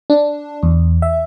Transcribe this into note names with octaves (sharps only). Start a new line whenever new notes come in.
D4
E2
E5